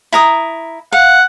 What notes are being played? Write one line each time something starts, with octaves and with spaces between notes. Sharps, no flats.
E4 A#5 D#6
F5 F#5